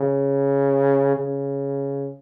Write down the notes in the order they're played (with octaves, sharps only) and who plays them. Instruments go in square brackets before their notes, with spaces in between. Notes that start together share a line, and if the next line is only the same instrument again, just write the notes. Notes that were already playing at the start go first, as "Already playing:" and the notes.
Already playing: [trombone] C#3
C#3